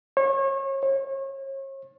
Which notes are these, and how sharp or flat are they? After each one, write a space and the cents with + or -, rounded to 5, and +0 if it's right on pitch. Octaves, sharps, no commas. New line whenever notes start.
C#5 -35
C#5 -40